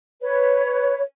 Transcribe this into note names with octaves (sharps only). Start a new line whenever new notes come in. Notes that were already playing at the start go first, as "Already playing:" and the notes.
B4 C#5